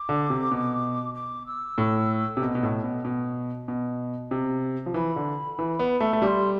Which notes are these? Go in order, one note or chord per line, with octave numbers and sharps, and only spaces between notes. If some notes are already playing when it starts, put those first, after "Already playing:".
Already playing: D6
D3
C3
B2
D6
E6
A2
C3
B2
B2
A2
B2
B2
B2
C3
F3
E3 B5
D3
E3
B3
A3
A3
G3 C6 D6